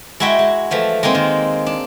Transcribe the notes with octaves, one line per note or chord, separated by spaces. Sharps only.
G#3 E4 F#4 E5 G5
G#3
E3 F3 A3
G#3 A#3 C4 D#4
D#3
D4